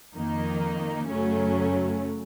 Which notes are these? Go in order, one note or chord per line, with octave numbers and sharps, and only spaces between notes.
F2 D#3 A#3 D#4
F#2 C#3 F#3 A3 C#4